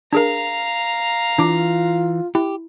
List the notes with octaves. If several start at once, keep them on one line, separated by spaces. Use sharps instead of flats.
D4 G#4 A#4 F5 A#5
E3 D4 F4 D6
E4 G4